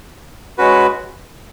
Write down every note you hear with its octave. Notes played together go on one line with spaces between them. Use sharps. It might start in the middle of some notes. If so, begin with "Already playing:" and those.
G#3 C#4 F#4 B4